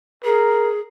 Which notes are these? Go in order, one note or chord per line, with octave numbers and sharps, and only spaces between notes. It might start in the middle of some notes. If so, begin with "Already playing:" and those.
G#4 A#4